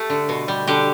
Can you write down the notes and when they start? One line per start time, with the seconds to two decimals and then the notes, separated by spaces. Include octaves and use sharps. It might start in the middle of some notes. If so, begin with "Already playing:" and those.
Already playing: A3 G4 A4
0.10 D3
0.29 B2
0.48 G3
0.67 D3 G4